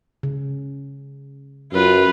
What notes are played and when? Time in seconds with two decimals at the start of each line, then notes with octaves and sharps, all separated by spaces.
0.23 C#3
1.73 F#2 F4 B4